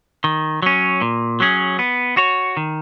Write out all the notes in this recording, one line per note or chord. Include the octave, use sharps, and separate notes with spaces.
D#3
F#3 C#4
A#2
F#3 C#4 G#4
B3
F#4 C#5
D#3